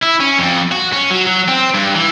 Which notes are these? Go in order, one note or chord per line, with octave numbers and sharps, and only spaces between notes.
E4
C#4
F2
F#4
C#4
F#3
F#3
C4
G2
E3